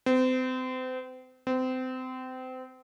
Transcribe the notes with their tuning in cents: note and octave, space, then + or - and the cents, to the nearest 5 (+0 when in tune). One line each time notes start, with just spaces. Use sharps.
C4 -35
C4 -30